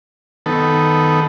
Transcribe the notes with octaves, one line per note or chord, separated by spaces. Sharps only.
D#3 B3 A4